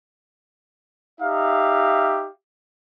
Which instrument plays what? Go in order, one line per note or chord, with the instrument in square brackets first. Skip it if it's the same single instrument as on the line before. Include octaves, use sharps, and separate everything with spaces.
[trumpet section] D#4 G4 E5 F5